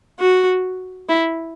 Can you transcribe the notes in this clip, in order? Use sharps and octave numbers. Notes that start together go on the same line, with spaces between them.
F#4
E4